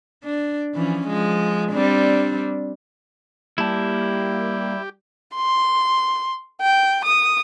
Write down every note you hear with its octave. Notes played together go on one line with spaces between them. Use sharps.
D4
E3 F3 C#4
F3 G#3
G3 C4 D4
G3 A#3 E4 G4 A5
C6
G5
D#6